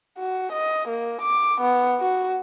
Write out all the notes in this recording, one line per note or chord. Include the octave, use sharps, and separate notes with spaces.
F#4
D#5
A#3
D6
B3
F#4